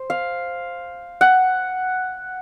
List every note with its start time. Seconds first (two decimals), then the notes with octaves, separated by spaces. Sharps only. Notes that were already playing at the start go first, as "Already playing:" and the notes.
Already playing: C5
0.10 F5
1.21 F#5